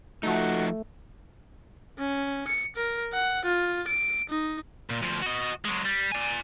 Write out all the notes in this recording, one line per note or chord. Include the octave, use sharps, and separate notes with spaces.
F3 A3 D#4 F#4
C#4
C#7
A#4
F#5
F4
D7
D#4
A#2
D2 F3
F#4 D#5
F#3 G#3
G3
D5 G#5